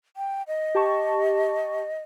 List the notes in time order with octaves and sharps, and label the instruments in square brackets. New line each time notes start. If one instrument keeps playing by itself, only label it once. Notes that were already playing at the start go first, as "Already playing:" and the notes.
[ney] G5
D#5
[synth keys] G4 A5 C#6